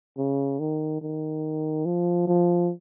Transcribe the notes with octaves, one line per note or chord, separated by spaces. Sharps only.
C#3
D#3
D#3
F3
F3